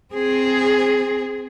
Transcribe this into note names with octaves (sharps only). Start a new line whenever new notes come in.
C4 G#4